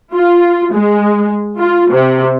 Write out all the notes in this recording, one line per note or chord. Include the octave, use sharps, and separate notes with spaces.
F4
G#3
F4
C3